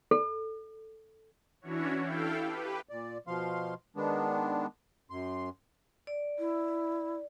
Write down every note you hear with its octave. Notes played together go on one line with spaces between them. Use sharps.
A4
E3 C#4 D4 E4 F#4 C#5
E4 A4 F5 G5
G4 B4
A#2 D5
B2 F3 F5 C6
D#3 G#3 B3 D4
F#2 C6
D5
E4